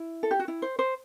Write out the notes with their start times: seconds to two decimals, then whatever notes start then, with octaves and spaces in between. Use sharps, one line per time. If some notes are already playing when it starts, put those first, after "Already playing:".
Already playing: E4
0.23 A4
0.31 G4
0.39 F#4
0.48 E4
0.62 C5
0.79 C5